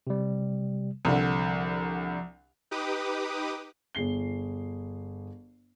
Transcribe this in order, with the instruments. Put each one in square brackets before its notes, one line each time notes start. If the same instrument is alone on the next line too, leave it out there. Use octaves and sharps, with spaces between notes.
[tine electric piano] C3 G3
[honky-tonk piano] C2 D3 [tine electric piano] F3
[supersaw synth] D#4 G4 B4 D6 D#6
[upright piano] G1 G#4 C7 G7